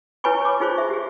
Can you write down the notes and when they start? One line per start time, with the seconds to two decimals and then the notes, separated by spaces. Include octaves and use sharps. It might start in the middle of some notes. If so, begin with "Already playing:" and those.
0.24 E4 B4 C#5 G#5 B5 C#6
0.45 C#5 D6
0.60 D#4 F4 G#4 C5 C#6
0.78 E5
0.90 G4 G#4